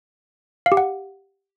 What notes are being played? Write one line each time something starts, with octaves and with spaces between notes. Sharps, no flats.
F5
G4
F#5